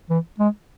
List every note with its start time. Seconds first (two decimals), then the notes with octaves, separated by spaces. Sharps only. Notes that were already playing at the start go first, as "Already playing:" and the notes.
0.10 E3
0.39 G#3